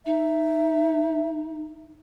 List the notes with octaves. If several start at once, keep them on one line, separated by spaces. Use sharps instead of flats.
D#4 E5